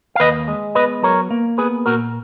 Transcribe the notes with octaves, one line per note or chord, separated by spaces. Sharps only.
F5
D#2 B4 D#5
G#3
B3 B4 D#5
F#3 A#4 C#5
A#3
B3 G#4 B4
A#2 F#4 A#4